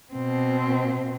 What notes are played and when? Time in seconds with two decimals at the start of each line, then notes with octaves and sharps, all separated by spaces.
0.13 B2 C4